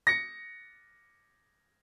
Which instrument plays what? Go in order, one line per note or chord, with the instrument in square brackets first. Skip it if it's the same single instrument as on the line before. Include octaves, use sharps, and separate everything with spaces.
[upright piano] A#6 C#7